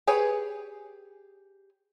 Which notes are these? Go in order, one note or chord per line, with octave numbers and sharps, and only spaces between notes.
G4 G#4 B4 C#5